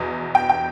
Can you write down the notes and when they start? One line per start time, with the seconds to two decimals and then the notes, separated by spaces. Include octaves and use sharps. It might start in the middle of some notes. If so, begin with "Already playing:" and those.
Already playing: E2 B2
0.35 G5
0.49 G5